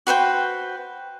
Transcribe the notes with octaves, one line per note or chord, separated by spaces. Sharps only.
F#4 B4 C5 G5